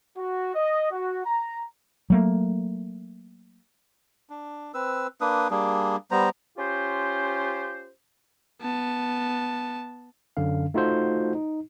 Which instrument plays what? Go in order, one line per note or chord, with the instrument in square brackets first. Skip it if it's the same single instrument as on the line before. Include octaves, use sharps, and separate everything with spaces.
[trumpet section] F#4
D#5
F#4
A#5
[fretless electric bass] F#3 A3 A#3
[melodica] D4
C4 B4 E6
A#3 D4 B4 D#6
G3 A#3 D4 G#4
G3 B3 C5 A#5
[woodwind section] C#4 F4 G4 C5
[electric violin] B3 A5
[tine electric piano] F#2 D3 C#4 F5
A3 D#4 F4 F#4 A4 C5
D#4